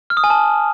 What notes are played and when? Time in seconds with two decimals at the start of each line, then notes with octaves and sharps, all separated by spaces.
0.10 F6
0.17 D#6
0.24 G#5
0.30 A5